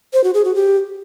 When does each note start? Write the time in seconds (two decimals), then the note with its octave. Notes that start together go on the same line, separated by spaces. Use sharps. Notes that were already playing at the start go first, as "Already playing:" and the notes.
0.13 C5
0.24 F#4
0.34 G#4
0.45 F#4
0.55 G4